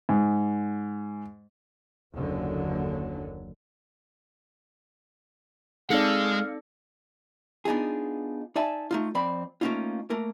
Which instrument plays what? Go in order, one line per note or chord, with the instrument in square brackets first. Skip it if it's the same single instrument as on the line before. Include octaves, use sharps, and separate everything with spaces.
[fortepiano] G#2
[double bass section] F#1 D#2 D3 F#3
[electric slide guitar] G#3 [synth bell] C4 D#4 C#7 [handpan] A4 D5 [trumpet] F5
[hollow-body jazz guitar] B3 D4 D#4 F4 G#4
D#4 D5 E5 G#5 A5
A3 D#4 F4
F2 C4 D5 B5
A3 A#3 C4 C#4 D#4 F4
A3 A#3 A#4